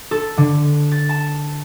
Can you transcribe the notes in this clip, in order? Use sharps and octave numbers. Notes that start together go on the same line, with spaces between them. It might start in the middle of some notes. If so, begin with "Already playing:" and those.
A4
D3
A6
A5